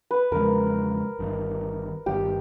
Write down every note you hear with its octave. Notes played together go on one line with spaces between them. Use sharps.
B4
E2 C#3 F3 G#3 A#4
G1 G2 D#3
G1 G2 D#3 G4